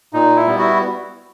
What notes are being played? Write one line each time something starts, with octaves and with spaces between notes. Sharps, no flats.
A#2 D#4
E4
G3 B3
E4 F#4